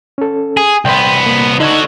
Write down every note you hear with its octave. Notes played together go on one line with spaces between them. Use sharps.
C#4 A4
G#4
C2 B3 G5 C6
A#3
D3 D#4 F#4 D#5 G#6